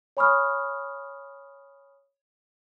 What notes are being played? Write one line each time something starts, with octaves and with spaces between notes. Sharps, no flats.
C#5 G#5 B5 C#6 D#6 F6